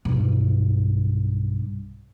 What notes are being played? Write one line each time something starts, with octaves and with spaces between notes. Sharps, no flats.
B1 G2